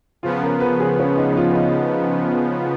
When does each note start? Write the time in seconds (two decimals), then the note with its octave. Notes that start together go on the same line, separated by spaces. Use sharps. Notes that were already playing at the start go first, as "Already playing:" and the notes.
0.23 C#3 F3 B3 F4
0.42 A#4
0.60 B4
0.80 G#4
0.99 C#4
1.17 D#4
1.33 D#4
1.37 F4
1.56 D#4